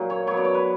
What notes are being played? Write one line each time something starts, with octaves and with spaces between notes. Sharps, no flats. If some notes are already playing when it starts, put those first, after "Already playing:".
Already playing: A#2 F#3 A#3
C#5
F#3 B3 C#5
D5
C#5
B4